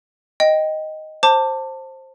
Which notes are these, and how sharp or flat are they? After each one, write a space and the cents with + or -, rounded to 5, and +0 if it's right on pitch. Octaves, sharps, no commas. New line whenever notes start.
D#5 +0 G5 +0
C5 +15 A5 +20 D6 +0